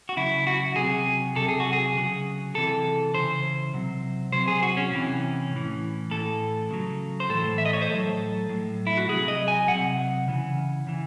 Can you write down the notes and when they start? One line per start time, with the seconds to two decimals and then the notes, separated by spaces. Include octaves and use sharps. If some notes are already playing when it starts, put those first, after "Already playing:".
0.09 F#4
0.17 C#3 F#3 E4
0.47 F#4
0.76 C3 F#3 G#4
1.35 C3 F#3 A4
1.48 G#4
1.60 F#4
1.73 G#4
1.95 C#3 F#3
2.55 C3 E3 A4
3.14 C#3 E3 C5
3.74 C3 F#3
4.32 C3 F#3 C5
4.48 G#4
4.63 F#4
4.77 C#4
4.92 C3 E3
5.52 A2 E3
6.11 A2 E3 A4
6.71 C#3 F#3
7.20 C5
7.30 A2 E3 A4
7.58 E5
7.65 D#5
7.73 C#5
7.82 C5
7.89 A2 F#3 A4
8.49 A2 F#3
8.87 E4
8.97 F#4
9.08 C3 F#3 G#4
9.28 D#5
9.48 G#5
9.68 C3 F#3 F#5
10.28 C#3 E3
10.87 C#3 E3